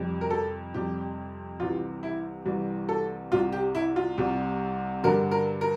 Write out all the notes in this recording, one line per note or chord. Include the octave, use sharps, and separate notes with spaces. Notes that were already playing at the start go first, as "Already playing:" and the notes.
Already playing: F2 C3 G3
A#4
A4
F2 C3 G3 G4
C2 C3 E3 G3 F4
E4
C2 C3 E3 G3
A4
C2 C3 G3 F4
G4
E4
F4
C2 C3 G3
G2 D3 G3 A#4
A#4
A#4